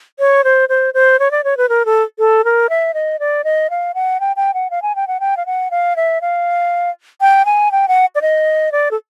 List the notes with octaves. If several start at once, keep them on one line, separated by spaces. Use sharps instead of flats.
C#5
C5
C5
C5
C#5
D5
C#5
B4
A#4
A4
A4
A#4
E5
D#5
D5
D#5
F5
F#5
G5
G5
F#5
F5
G#5
G5
F#5
G5
F5
F#5
F5
E5
F5
G5
G#5
G5
F#5
D5
D#5
D5
A4